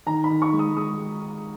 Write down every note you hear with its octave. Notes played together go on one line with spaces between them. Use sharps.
D#3 A#5
B5
D#3
C#6
G#3
D#6
G#3 D#6